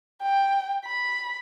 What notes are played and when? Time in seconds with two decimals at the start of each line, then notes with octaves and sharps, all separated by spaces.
0.22 G5
0.85 B5